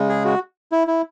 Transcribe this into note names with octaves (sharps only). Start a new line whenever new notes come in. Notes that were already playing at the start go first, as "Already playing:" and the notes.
Already playing: C#3 G#3
G#4
F#4
E4
E4